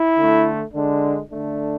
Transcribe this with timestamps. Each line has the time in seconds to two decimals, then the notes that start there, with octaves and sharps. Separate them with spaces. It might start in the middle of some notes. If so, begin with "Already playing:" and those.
Already playing: E4
0.16 D3 A3
0.73 D3 G#3 D4
1.31 D3 A3 D4